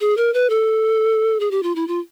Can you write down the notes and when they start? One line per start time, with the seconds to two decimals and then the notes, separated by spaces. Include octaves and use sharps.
0.01 G#4
0.17 A#4
0.34 B4
0.50 A4
1.40 G#4
1.51 G4
1.63 F4
1.76 E4
1.88 F4